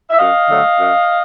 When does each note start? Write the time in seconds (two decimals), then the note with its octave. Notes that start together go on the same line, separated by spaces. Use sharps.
0.10 E5
0.19 F#2 D#5 F5
0.49 D3 F#3 A3
0.79 F#2